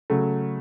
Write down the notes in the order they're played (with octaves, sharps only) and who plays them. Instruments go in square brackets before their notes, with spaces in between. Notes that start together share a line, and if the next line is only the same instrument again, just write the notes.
[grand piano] C#3 F#3 A3